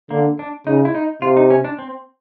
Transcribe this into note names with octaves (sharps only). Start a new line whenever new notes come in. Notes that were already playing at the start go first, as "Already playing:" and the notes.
D3 A#3
D4
C#3 D#4
E4
D#4
C3 F4
D#4
C#4
D4
C4